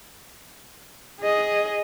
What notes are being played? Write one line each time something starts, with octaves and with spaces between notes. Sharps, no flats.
G#4 D#5